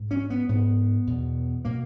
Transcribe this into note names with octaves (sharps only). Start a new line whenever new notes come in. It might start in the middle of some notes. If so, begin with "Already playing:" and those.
Already playing: G#2
C#4
B3
G#2 B3
E2 B2
B2 A#3